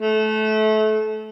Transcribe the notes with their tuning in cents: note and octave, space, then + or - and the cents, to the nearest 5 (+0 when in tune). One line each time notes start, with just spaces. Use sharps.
A3 -25